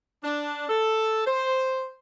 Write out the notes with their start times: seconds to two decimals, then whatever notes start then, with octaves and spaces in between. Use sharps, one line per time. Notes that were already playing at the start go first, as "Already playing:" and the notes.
0.24 D4
0.69 A4
1.27 C5